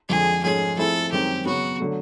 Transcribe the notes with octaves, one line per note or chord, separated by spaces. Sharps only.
F2 D3 F3 G#3 G#4
G#2 F3 A3 C#4 G#4
F3 A3 C4 E4 G#4 A4
F#2 D#3 G#3 C4 G4
C#3 F#3 B3 F#4
D3 F#3 A3